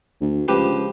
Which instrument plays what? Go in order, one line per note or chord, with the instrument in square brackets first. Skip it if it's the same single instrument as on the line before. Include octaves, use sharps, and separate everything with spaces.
[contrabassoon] D2
[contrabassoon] C#2 [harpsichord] F3 G4 B4